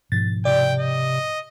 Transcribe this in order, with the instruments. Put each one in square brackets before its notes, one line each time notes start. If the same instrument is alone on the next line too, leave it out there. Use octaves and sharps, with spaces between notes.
[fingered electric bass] G#2 B2 F3 [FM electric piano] A6
[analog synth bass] C3 [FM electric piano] D5 [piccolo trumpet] G5
[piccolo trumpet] D#5